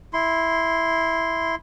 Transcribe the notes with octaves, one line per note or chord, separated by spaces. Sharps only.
E4 C6